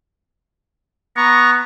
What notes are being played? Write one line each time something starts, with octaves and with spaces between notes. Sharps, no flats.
B3 A#5 C#6